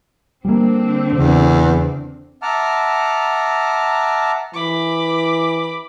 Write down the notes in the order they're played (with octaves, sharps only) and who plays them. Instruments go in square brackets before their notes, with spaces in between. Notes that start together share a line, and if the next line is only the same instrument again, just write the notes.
[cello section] D3 C4 D4 [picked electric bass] G3 A#3
[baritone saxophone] E2 [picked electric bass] C#3
[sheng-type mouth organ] E5 F#5 A5 A#5 D6 F6
[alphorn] E3 [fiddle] B5 D6